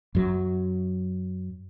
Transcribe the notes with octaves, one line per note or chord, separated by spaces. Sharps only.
F#2 F#3